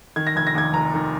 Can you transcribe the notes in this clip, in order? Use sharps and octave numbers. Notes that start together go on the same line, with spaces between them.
D#3 G#6
A#6
F1 G#6
A#6
D#2 G#6
F1 A#5
D#3